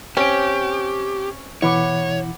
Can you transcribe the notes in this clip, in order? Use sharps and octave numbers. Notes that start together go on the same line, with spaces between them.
C4 C#4 G4 C#5 D7
B2 E3 E4 C#5 F#5 B5 D6